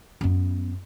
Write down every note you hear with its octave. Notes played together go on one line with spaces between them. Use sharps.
F#2 B3